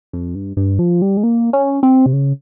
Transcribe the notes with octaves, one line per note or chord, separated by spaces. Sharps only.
F2
G2
G2
F3
G3
G#3
A#3
C#4
C4
C3
C#3